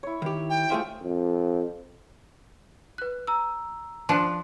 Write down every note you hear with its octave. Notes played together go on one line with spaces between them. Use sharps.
E4 C#5
D#3 G4
G5
A3 F4 G4 G#4 C5 E5
F2
B4 F#6
A#5 E6
F3 D4 C6 F#6